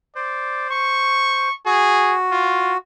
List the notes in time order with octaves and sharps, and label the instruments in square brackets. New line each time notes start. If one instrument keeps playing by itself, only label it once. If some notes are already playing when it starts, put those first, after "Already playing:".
[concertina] C5 [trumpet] D5
[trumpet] C#6
[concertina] F#4 [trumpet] G#4
[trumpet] F4